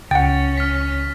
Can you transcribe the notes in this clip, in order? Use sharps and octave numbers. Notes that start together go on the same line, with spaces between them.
C#2 C#4 F#5 G5 A6
F6 B6